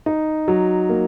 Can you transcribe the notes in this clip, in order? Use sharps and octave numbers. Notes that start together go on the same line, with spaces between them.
D#4
F#3
A#3